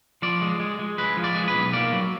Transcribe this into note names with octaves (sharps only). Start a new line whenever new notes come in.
F3 D5
G#3
G#3
G#3
G#3 B4
F3
D5
G#3
B4
B1
A#3 D5
F#3